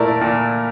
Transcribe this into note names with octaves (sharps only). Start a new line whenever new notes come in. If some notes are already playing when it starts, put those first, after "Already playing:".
Already playing: A#2 A3 E4 A#4 D5
A#2